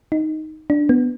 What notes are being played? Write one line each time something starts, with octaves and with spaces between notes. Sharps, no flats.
D#4
D4
B3